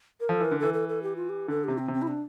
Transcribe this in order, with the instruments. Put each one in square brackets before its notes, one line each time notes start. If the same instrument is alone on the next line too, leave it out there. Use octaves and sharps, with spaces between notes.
[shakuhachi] A#4
[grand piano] F3 [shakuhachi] A4
[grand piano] E3 [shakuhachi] A#4
[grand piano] D3
[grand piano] E3 [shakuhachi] A4
[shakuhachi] A4
A4
G4
F4
G4
[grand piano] D3 [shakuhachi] A4
[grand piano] C3 [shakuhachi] G4
[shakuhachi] C4
[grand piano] C3
[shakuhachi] C4
E4
D4